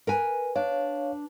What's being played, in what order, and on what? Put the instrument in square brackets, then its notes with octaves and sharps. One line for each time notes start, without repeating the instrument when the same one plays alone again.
[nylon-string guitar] A#4 B4 G#5
[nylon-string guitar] D4 [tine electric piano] C#5 F5